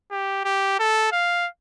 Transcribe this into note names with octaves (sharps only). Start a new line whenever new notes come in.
G4
G4
A4
F5